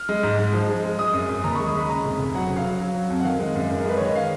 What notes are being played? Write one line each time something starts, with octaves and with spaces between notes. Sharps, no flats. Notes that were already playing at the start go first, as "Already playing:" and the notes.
Already playing: F6
G#3
G#2
G#3
F3
G#3
G#3
G#3 D#6
F#2
F#2
D#2 A#5
B5
C#6
G#3
D#6
G#3 B5
C#3 A#5
F1
F1
F#3 F#5
C#3
F5
F#3
F#3
F#3
F2
F#5
D#3 F5
G#3
F#2
F#2
A#4
G#3 B4
D#3 C#5
D#5
F5